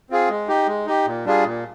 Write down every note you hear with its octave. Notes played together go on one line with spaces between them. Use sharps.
C4 F4 G#4
G#3
D#4 G4
G#3
D#4 G4
A#2
G3 D4 F4 G#4
A#2